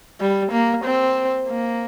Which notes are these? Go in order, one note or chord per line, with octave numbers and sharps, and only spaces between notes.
G3
A#3
C4
A#3